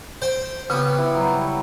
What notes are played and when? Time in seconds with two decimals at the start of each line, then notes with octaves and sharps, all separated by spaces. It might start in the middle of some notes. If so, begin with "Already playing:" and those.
0.22 C5 G5
0.70 C#3 B3 G4 C#5
0.98 E4
1.13 F#3 G3